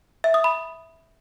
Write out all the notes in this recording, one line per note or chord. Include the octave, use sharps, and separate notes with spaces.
E5
D#6
B5